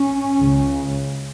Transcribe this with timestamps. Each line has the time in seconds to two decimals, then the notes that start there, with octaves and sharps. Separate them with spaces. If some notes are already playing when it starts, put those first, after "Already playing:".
Already playing: C#4
0.38 C#2 C#3